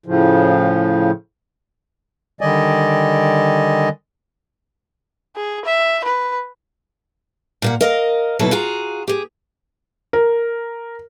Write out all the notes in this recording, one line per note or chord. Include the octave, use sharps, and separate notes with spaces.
A2 C#3 F3
D3 D#3 G3 D5 D#5 G#5
G#4
E5
B4
A#2 A#3 F#5
A#4 D#5 F5
D#2 B2 F#3 E4 A4
F4 F#4 G#4 A#5
G4 G#4
A#4